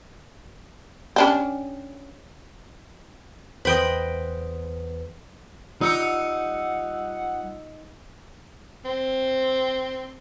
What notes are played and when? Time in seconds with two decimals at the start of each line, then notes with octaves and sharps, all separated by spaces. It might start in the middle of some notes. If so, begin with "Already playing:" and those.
1.16 C#4 D4 G4
3.65 E2 B4 C5 D#5 G5 B5
5.81 G3 D#4 F4 F#5 E6 C#7
8.85 C4